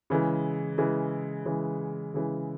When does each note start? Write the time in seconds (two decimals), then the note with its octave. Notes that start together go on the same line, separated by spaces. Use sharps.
0.10 C#3 E3 G#3
0.78 C#3 E3 G#3
1.45 C#3 E3 G#3
2.14 C#3 E3 G#3